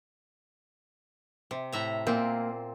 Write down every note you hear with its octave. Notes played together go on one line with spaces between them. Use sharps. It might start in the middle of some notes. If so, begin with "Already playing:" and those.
C3
A2 E5 A#5
A#2 A#3 C4